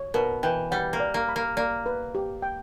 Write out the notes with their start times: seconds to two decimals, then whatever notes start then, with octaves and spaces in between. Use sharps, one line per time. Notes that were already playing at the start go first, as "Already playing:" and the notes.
Already playing: C#5
0.14 B2 A#4
0.43 E3 G5
0.71 G3 F#5
0.93 A#3
1.00 D5
1.14 A#3
1.29 B5
1.36 A#3
1.57 A#3 D5
1.86 B4
2.15 G4
2.42 G5